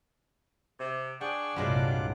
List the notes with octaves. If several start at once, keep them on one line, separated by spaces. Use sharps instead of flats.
C3
D4 G#4 D5 F#5 G5 C#6
C2 G2 A#2 F#3 G#3 F4 F#5 D6